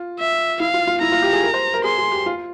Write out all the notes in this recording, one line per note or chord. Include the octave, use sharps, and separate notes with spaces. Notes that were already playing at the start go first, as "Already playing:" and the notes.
Already playing: F4
E5
E4 F5
F4
F4
E4 A#5
F4
G4
G#4
A#4
C5
A#4
G#4 C6
G#4
G4
F4